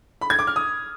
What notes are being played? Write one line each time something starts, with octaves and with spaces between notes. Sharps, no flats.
B5
G#6
D6
F6
D#6